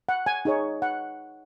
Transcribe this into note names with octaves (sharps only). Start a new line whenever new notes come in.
F#5
G#5
D#4 G#4 C#5
F#5